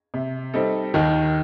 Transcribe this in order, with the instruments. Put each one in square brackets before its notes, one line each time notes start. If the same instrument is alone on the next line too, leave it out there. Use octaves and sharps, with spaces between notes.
[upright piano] C3
G3 C4 D#4 A4
[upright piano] D#2 [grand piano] D#3